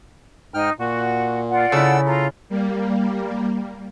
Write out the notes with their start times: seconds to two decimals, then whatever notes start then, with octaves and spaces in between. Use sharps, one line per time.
0.54 G#2 D#4 G5 F6
0.79 A#2 F#4
1.50 F4 D5 F#5
1.72 C#3 E4 A4 E6
2.05 F4 A4 A#5
2.49 G3 A#3